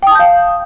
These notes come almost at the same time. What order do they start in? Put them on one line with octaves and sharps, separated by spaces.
G5 D#6 A5 G6 F5